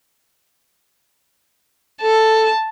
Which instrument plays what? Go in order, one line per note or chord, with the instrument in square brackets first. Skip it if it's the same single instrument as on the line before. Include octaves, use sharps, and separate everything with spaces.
[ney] A4 [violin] A5